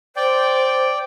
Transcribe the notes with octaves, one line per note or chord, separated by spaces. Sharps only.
C5 D5 G5